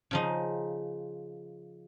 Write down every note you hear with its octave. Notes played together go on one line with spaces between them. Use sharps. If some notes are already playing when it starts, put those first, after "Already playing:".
C#3 F3 D#4